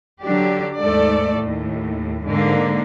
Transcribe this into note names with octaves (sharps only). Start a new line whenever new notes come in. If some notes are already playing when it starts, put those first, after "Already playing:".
D3 F#3 D4 G4
D#2 G#2 A3 A4 D5
D#2 A2
G#2 D3 A#3